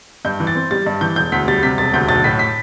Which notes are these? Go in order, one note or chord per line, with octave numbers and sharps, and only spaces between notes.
G2 G6
E3
A6
C4
G3 A6
G2
E3 G6
E1 G6
D2 B6
G3 A6
C3 B6
E1 A6
D2 G6
B1 A6
A2 B6
B6